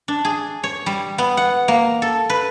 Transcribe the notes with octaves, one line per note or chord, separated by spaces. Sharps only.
D4
G#4
C#5
G3
B3
F#5
A#3
A4
B4